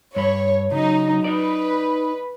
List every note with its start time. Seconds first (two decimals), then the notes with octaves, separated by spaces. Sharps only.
0.16 G2 C#5 B5
0.72 C#3 F#3 D#4
1.24 D#4 B4 D5